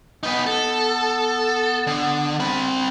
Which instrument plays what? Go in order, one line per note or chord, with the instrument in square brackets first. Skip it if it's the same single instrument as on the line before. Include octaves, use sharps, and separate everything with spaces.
[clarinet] B3 [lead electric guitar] D#4 B4
[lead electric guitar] A4
D3
C4 B5